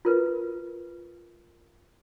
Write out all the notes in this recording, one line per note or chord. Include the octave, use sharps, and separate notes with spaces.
F4 A#4 B4